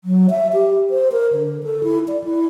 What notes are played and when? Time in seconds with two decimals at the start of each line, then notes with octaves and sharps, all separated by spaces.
0.04 F#3
0.30 E5
0.53 G4
0.90 C5
1.12 A#4
1.32 D3
1.63 A4
1.83 E4
2.08 D5
2.24 E4